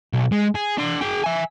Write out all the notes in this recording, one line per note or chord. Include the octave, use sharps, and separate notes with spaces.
B1
G#3
G#4
D4 C6
G#4 G5
E5 G#5